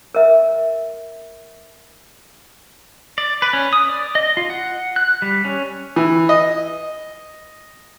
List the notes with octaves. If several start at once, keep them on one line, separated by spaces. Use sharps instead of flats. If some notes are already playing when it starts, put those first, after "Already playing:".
A#4 E5
D5
B4
C#4
D#6
D5
D#5
F4
F#5
F#6
G3
C#4
E3
D#5